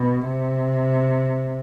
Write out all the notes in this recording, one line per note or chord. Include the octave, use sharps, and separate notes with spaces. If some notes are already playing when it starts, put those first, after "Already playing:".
Already playing: B2
C3